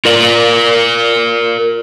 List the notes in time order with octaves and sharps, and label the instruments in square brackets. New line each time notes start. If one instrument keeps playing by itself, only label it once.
[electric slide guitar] F4 A#4 D5